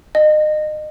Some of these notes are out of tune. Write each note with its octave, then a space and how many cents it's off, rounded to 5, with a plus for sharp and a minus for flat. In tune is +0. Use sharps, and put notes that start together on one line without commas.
D#5 -30